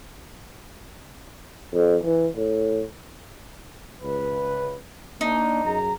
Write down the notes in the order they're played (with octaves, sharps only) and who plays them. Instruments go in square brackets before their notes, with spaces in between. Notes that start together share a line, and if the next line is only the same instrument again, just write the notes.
[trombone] F2
E3
A2
[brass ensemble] C#2 B4
[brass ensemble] A#3 D4 [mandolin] D#4
[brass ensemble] F#2 G#4 A#5